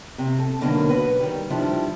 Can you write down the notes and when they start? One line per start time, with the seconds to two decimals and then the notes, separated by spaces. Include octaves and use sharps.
0.18 C3
0.39 A4
0.61 B2 D3 D#3 F#3 A#3
0.89 F#4 B4
1.20 D#3 G3
1.50 D#3 F3 G3 D4 E4